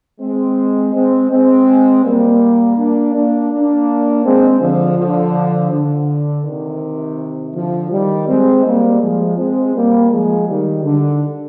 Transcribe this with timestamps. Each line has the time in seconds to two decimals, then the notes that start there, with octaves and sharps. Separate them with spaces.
0.21 G#3 C4
0.94 G#3 C4
1.31 G#3 C4
2.04 G3 A#3
2.77 A#3 D4
3.15 A#3 D4
3.52 A#3 D4
4.24 G#3 C4
4.61 D3 F3
4.98 D3 F3
5.71 D3
6.44 C3 D#3
7.54 D3 F3
7.91 D#3 G3
8.28 G#3 C4
8.65 G3 A#3
9.01 F3 G#3
9.38 G#3 C4
9.75 G3 A#3
10.11 F3 G#3
10.48 D#3 G3
10.85 D3